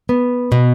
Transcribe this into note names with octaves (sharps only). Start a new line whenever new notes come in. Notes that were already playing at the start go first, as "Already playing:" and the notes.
B3
B2